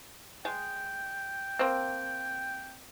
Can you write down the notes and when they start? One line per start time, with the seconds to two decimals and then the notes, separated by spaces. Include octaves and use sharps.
0.45 G#3 G5
1.59 A#3 C4